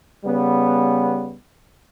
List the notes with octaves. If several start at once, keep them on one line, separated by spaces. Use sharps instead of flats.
C#3 G3 B3